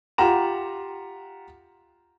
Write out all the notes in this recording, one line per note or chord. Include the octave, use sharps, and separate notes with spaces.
F4 G4 F#5 A#5 E7